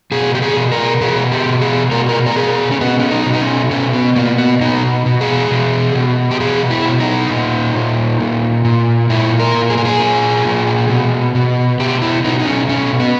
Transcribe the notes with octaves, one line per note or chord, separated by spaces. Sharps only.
B2 G#4
G4
G#4
B2
A#4
B2 G#4
G4
B2
G#4
B2 A#4
A#4
A#4
B2 G#4
C#4
B2 B3
C#4
D#4
B2
D#4
C#4
B2 C#4
B3
B2 A#3
B3
B2 D#4
B2
G#4
B2
B2
G4
B2 G#4
E4
B2
D#4
A#2
A#2
A#2
A#2
A#2 E4
A#4
A#2
G#4
A#4
G#4
A#2
A#2
B2
B2
B2 G4
E4
B2 D#4
D#4
C#4
B2 C#4
B3